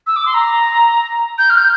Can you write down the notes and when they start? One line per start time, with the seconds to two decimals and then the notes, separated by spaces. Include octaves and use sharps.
0.06 E6
0.16 D6
0.25 C6
0.34 A#5
1.38 G6
1.50 F6
1.57 G6